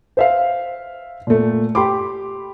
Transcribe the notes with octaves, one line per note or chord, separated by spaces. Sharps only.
C5 E5 F5
A#2 A3
G4 G5 B5 C6 D6